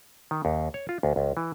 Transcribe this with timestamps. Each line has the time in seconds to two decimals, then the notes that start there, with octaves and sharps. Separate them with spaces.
0.31 D#3
0.45 D#2
0.74 C#5
0.89 F4
1.03 D2
1.16 C#2
1.37 E3